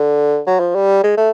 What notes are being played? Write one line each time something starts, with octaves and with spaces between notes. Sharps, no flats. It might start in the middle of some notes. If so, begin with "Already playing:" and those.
Already playing: D3
F#3
F3
G3
G#3
A3